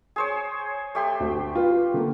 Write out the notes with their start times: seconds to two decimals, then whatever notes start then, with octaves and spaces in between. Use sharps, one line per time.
0.16 G#4 C5 C#5
0.95 A3 G4 C6
1.20 D2
1.55 F4 B4
1.94 D3 A#3